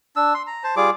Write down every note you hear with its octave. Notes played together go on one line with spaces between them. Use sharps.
D4 E6
C6
A#5
C5 A5
G3 F4 G#4 D6